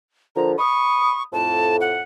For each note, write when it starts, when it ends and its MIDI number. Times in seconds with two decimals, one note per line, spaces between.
0.36 0.53 46
0.36 0.53 50
0.36 0.53 53
0.36 0.52 82
0.58 1.18 83
0.58 1.23 85
0.58 1.18 87
1.33 2.02 41
1.33 2.02 45
1.33 1.76 81
1.81 2.01 78